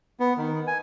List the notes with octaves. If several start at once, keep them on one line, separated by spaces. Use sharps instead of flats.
B3
D#3
G#5